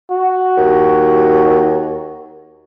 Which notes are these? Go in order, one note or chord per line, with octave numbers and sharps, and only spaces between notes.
F#4
D#2